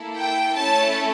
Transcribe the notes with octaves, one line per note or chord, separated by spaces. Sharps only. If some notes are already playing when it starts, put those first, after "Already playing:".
Already playing: A#3 E4 A4
G5
A3 C#4 E4 A4 A5